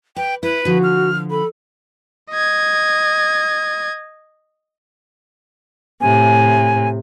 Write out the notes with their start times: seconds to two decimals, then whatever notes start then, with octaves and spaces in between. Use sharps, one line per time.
0.16 B4 G5
0.43 E4 B4
0.65 D3 F3 F#4
0.83 F6
1.31 A4 B5
2.31 D#5 G#6
6.01 A2 C3 G#5